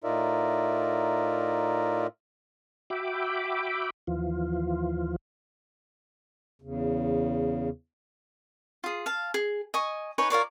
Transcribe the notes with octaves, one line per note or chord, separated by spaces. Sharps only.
A2 D#4 F4 A#4 D5 E5
F#4 E5 G5 B5 D6
D#2 E3 F3 F4
E2 C#3
F4 G#4
F5 A5
G#4
D#5 G#5 C#6
D#4 B4 C#5 G#5
F4 A#4 C#5 D5